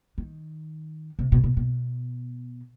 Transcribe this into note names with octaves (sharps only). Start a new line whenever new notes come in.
D#3
C3
B2
B2
B2